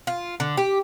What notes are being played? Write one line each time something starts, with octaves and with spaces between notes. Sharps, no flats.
F4
D3
G4